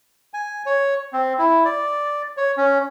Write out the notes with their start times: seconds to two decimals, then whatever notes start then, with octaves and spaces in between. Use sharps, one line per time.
0.34 G#5
0.66 C#5
1.13 C4
1.39 E4
1.65 D5
2.37 C#5
2.57 C#4